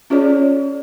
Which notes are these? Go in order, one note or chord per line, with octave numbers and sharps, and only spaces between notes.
C#4 F4 G#4 C#5 D5